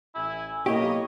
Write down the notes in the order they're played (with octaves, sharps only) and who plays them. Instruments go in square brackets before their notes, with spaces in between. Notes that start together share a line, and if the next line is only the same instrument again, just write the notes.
[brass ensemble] A1 G#5 [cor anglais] E4
[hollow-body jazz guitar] B1 E4 G4 [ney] A#3 [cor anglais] C#5 [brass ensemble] D#5